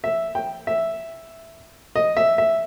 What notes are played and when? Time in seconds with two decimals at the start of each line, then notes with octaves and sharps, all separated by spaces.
0.04 E5
0.35 G5
0.67 E5
1.96 D#5
2.17 E5
2.38 E5